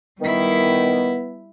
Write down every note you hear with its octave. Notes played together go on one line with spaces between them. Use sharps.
D#3 G3 B3 E4